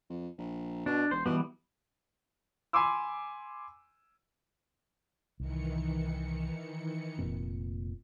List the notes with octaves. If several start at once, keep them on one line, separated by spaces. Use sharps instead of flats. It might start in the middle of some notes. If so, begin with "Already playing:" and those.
F2
A#1
B2 D4
E1 C5
B2 E3 G3 B3
G#5 B5 C6 D6 E6
C2 D#3 E3 C#7
F1 A#2 C4